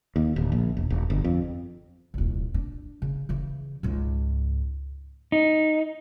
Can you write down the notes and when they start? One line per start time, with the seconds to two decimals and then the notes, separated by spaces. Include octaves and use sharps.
0.16 D#2
0.36 D1
0.52 A#1
0.77 E1
0.90 E1
1.10 G1
1.24 F2
2.14 D#1 C2
2.54 D4
3.02 C#3
3.29 C#3 E3
3.83 C#2 G#2
5.32 D#4